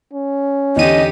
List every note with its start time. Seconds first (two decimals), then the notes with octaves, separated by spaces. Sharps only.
0.13 C#4
0.76 E2 D3 D#4 G4 D#5 D#7